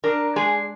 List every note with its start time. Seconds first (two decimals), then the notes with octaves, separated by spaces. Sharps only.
0.04 D4 A#4
0.36 G#3 G#4